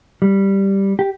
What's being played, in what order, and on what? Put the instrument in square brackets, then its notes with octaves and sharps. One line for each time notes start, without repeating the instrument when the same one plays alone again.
[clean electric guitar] G3
G4